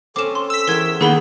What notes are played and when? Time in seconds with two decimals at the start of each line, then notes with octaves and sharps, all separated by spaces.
0.16 C4 C#4 A4 D6 E7
0.35 C6
0.50 E6 B6
0.67 E2 A#4 C#5 G5 G#6
1.01 D#3 A#3 B3 G#4 F#5 B5 G7